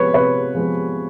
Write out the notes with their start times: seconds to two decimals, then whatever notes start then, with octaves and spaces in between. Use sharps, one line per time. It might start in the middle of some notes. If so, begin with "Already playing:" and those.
Already playing: C3 F3 G#3 B3 B4 C#5
0.14 C3 B4 C#5
0.55 F3 G#3 B3